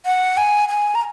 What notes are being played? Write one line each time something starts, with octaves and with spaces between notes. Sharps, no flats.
F#5
G#5
G#5
A#5